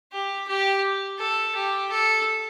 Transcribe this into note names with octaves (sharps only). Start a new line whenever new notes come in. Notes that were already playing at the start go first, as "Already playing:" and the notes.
G4
G4
A4
G4
A4